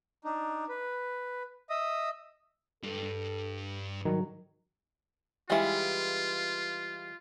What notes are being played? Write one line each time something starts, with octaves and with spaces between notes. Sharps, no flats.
D4 D#4
B4
D#5 E5 D#6
G2 A4
G#2 D#3 F#3
E3 G3 G#3 F4 F5